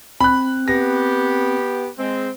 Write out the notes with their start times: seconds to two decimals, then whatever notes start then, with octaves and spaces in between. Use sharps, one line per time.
0.20 C4 B5 F#6
0.68 B3 G4 A#6
1.99 G#3 C4